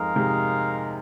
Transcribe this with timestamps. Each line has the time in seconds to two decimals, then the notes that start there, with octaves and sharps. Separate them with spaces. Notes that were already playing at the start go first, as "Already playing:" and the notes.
Already playing: F2 G#2 G#3 D#4 A#4 F5
0.16 G#2 C3